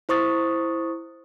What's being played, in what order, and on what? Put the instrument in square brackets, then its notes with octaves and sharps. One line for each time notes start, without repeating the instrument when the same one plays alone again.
[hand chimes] E4 C5 C#6 D#6 A6